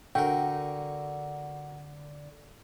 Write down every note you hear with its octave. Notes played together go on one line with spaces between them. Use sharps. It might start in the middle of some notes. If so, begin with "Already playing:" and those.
D3 F#4 A#4 G5